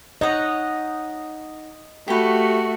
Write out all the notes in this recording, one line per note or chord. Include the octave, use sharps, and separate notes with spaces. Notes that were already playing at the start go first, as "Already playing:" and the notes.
D#4 C#5 D#5 F#5
A3 F#4 G4 B4